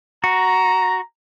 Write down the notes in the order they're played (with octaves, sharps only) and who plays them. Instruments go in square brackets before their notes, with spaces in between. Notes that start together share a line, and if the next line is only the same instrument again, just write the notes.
[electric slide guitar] F#4 [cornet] A#5